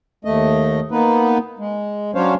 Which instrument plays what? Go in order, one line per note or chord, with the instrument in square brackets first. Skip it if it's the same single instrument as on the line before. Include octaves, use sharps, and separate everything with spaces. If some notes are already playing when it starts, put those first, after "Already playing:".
[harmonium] D#2 A3 D#5
A#3 B3 D#4 B4
G#3
F#3 C#4 D4 C5 C#5 F5